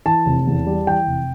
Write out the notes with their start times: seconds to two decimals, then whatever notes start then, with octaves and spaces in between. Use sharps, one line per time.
0.06 E3 A5
0.26 F1
0.47 E2
0.67 G3
0.87 E3 G5
1.07 F1